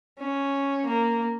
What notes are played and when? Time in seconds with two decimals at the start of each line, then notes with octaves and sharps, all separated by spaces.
0.19 C#4
0.86 A#3